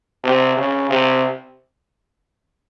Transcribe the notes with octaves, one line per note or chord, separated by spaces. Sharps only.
C3
C#3
C3